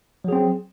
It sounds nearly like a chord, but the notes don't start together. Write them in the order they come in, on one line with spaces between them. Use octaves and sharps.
F#3 G#4 C4